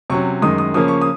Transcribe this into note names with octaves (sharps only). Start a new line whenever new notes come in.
C3 F#3 C#4 C#6
F#2 D#3 G#3 D#6
D#6
C#3 F3 A#3 C#4 D#6
C#6
D#6